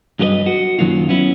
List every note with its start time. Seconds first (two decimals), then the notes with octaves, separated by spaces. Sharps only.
0.19 G2 F#3 F4 G4 B4 D#5
0.46 F#4
0.79 F#2 D#3 F#3 A#3 F4
1.09 B3 C#4 E4